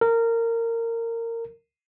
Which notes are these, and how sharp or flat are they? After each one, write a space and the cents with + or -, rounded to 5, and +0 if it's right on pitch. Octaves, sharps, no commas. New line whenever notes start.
A#4 -20